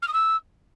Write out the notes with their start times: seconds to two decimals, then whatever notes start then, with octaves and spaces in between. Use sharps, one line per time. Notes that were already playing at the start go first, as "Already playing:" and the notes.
0.02 F6
0.07 D#6
0.13 E6